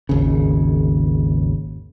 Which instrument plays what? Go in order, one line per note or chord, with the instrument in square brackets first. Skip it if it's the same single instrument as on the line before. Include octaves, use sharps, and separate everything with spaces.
[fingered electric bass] G#1 D#2 C#3